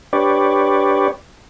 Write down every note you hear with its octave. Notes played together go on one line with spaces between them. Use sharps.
D4 G4 B4 C#5 D5